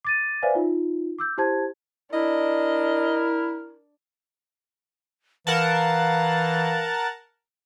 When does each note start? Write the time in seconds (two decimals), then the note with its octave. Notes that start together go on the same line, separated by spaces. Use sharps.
0.05 D6 A6 D#7
0.42 B4 C5 D5 E5 F5 G#5
0.55 D#4 F4
1.19 D6 E6 G6
1.37 E4 G4 C5 A5 G#6
2.13 D4 E4 A#4 D#5
5.47 E3 A#4 F5 F#5 A5